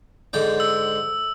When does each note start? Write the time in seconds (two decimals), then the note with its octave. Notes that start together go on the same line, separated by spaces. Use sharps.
0.33 G#2 D3 G5
0.60 E6